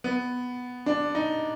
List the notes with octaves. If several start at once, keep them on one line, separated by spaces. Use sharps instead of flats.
B3
D4
D#4